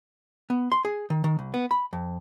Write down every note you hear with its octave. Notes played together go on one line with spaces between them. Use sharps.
B3
C6
G#4
D#3
D#3
C2
B3
B5
F2